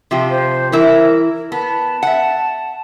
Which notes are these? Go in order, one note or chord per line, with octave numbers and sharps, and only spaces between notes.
C3 F3 G4
C5
E3 E4 A#4
B3 A5
E5 F#5